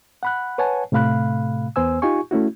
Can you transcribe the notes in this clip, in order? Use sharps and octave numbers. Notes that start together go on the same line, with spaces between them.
F#5 B5 F#6
B4 C#5 F#5 G#5 A5
A2 C3 A3 F5 B5 F#6
E2 B3 C5 G#5 E6
D#4 F4 G4 G#5 C#6
A3 C#4 E4 F#4